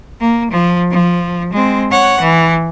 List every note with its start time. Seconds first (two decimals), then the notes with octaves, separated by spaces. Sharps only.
0.21 A#3
0.51 F3
0.91 F3
1.53 G#3 C4
1.91 C#5 F#5
2.21 E3